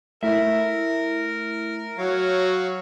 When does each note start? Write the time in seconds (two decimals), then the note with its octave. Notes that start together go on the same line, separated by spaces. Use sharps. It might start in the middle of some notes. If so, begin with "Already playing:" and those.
0.23 A3 E4 A#4 E5
1.98 F#3 C#5 F5